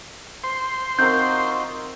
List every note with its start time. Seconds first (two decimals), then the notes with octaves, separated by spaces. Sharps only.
0.44 C5 C6
0.99 C4 D#4 F4 F#4 A#4 G6